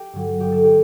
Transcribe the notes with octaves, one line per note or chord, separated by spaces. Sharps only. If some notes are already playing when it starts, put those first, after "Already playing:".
Already playing: G4
G2 D3 F#3
G1 G4
A4
D3 G4